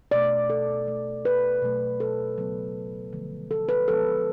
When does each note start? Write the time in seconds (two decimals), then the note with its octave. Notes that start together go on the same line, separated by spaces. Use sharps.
0.11 B2 A3 D5
0.50 A4
0.87 B2 A3
1.25 B4
1.62 B2 F#3 A3
2.00 A4
2.37 C#3 F#3 B3
3.13 D3 F3 A3
3.51 A4
3.69 B4
3.88 F3 G#3 B3 A4